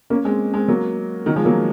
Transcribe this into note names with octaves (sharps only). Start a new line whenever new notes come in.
A#3 C#4
G#3 C4
G#3 C4
F#3 A#3
D#3 F#3
F3 G#3
F#3 A#3